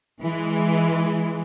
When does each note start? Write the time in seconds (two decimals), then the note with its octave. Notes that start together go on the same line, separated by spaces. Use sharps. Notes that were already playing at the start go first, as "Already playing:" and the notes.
0.21 E3 G#3